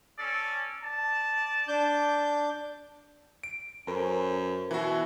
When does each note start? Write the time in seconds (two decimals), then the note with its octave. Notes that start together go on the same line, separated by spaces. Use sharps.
0.18 C#4 A4 D5
0.82 D5 A5
1.68 D4 D6 G6
3.44 D7
3.87 F#2 C#4 A4 A#4 C5
4.71 B2 E3 F#4 E5